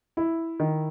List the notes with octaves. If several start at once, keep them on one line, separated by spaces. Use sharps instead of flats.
E4
D#3